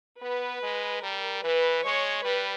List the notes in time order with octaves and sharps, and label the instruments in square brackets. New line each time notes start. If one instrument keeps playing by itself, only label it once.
[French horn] B3 [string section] B4
[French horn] G#3
[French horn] G3 [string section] A#4
[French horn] E3 [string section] B4
[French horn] G#3 [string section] C#5
[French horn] G3 [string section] B4